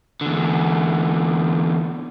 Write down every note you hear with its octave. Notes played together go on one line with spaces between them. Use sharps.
E2 D3